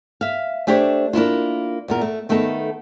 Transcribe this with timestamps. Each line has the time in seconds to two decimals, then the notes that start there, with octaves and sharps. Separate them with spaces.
0.21 E5 F5
0.67 A3 D4 G4 C5 C#5
1.13 A#3 D4 E4 F4
1.88 E2 A#2 A#4
2.01 A3
2.29 D#3 A3 B3 D#4 A4